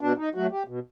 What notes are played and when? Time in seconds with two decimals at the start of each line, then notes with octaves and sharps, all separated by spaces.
0.01 B2 D4
0.18 D#4
0.34 F#3 A3 F#4
0.51 G4
0.68 B2